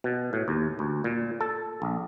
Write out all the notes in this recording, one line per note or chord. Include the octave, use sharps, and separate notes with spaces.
B2
A2
D#2
D2
A#2
A4
A#1